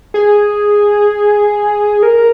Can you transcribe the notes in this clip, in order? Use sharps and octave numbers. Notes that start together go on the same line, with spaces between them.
G#4
A#4